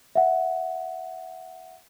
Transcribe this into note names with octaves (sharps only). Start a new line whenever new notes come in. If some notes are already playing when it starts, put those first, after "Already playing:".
E5 F#5